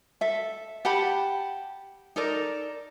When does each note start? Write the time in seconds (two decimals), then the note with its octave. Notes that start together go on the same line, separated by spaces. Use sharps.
0.21 A4 E5
0.85 G4 F#5 A5 B5
2.16 D#4 A4 A#4 D5